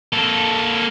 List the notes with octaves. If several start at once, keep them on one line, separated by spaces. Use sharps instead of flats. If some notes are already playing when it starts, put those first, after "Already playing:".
A#3 A4